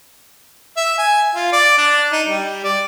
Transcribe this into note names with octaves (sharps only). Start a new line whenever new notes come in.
E5
G#5
F4
D5
D4
D#4
G3
D5